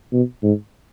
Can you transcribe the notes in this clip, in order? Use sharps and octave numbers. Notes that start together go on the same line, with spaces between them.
B2
G#2